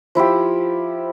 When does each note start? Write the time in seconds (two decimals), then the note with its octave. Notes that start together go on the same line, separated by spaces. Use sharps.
0.15 F3 E4 F4 G4